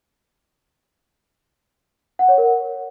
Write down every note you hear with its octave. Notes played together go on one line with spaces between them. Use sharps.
F#5
C#5
A#4